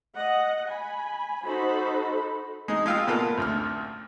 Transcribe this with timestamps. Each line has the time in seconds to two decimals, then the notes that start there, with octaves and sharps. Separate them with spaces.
0.16 D#5 F#5
0.68 G#5 B5
1.44 D#4 F#4 A4 C5 B5
2.68 G#3 D#4
2.86 G#3 F4 F5 G5 E6
3.07 A#2 B3 F4 A4 A#4
3.38 A1 D2 F6